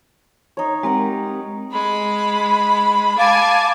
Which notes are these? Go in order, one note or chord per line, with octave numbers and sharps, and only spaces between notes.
D#4 C#5
G#3 C4 G4 A#4 F#5
G#3 B5
F5 G#5 A5 D6